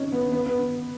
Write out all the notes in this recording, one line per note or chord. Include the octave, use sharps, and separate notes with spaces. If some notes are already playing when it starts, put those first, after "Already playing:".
Already playing: C#4 D#4
B3
B3
B3